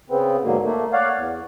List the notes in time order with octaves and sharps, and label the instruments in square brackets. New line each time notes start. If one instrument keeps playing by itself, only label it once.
[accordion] C#3 B3 C4
G#2 B2 D3 F#3 A#3
A3 A#3
C#5 D5 F5 F#5
E2